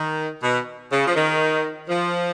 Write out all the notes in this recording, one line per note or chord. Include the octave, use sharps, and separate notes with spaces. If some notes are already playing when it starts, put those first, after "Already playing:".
Already playing: D#3
B2
C#3
F3
D#3
F3